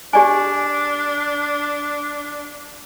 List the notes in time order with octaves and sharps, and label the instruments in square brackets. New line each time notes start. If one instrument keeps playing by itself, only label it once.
[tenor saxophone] D4 [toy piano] G4 D5 G#5